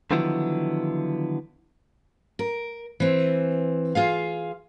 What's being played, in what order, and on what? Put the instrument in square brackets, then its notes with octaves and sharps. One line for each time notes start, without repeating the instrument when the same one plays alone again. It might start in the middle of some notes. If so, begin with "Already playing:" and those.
[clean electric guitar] D3 D#3 F3 F#3 B3 E4
[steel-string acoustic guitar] A#4
E3 C4
F4 G#4 F5